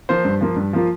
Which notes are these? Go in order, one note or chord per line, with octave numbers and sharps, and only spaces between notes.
F3 A#3 F4 C5
G2
F3 A#3 F4
G2
F3 A#3 F4